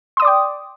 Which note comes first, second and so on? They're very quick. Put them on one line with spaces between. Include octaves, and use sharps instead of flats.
C6 D#6 D5 D6 G5